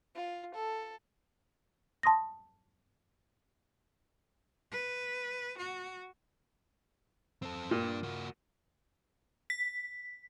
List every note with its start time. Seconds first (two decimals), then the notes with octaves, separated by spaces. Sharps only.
0.15 F4
0.55 A4
2.03 A5 C6 D#6 A#6
4.72 B4
5.58 F#4
7.42 C4 A4
7.71 A#2 D4 G4
8.03 A#3 F#4
9.50 B6